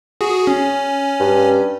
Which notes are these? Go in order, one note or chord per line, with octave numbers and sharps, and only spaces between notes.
F#4 G#4
C#4
G2